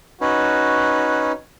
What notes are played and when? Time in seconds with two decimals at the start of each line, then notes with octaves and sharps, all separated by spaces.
0.21 C#4 D#4 F#4 B4